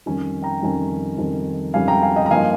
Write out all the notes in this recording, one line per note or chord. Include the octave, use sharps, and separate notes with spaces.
F2 D#3 G3 C#4
G5 A#5
F2 D#3 G3 C#4
F2 D#3 G3 C#4
F2 D#3 G3 C#4 F5 G#5
G5 A#5
F5 G#5
D#5 G5
A#5
G2 F3 A#3 D#4 F5 G#5